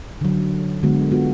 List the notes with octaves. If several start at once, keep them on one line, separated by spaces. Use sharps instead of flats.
D3 F#3
D3 G#3 B3 F#4
B3 F4 F#4